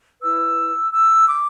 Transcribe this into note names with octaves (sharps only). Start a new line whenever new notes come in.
E4 B4 E6
E6
D6